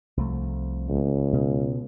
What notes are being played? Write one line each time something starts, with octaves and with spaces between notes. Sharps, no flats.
C2 F3 A3
C#2
B2